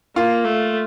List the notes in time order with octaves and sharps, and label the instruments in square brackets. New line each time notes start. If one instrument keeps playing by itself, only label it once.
[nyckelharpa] A#3 [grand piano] F4
[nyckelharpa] A3